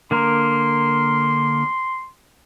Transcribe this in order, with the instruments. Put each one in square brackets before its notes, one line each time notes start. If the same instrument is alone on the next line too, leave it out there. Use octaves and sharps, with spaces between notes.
[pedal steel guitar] D3 A#3 A#4 [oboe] C6